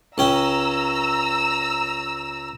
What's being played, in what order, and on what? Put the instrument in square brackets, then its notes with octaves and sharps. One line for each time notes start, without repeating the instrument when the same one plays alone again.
[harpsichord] C#2 C#4 G5 [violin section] A#5 E6